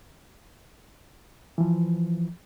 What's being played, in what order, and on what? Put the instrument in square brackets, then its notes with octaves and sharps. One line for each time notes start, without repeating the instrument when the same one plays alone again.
[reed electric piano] E3 F3